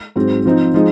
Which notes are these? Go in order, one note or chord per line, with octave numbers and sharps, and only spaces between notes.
G#2 F#3 C4
F3 C4 D#4
F3 G#3 D#4